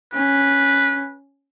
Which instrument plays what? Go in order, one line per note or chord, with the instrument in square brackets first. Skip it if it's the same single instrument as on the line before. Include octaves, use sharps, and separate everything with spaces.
[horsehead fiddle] C#4 [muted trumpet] B4